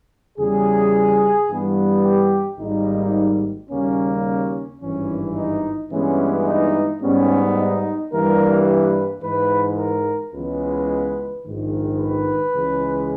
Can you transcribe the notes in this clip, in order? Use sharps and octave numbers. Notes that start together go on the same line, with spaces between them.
E2 C#3 G3 G#4
G2 E3 G3 B3
G4
G#1 G#2 G3 A#3 D#4
D#2 C#3 G3 A#3 C#4
C#4
G#1 G2 E3 C#4
D#4
G2 E3 G#3 B3 C#4
D#4
G#2 G3 B3 C#4
D#4
G2 E3 G3 A#3 A#4
B4
G#2 E3 G#3 B4
A#4
C#2 C#3 E3 G#3 B3 B4
A#1 G#2 D#3
B4
C#2 C#3 E3 G#3